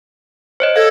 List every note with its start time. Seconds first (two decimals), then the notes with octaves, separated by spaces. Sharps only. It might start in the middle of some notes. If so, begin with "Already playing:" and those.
0.60 C5 C#5 D#5
0.76 A4 F5 G#6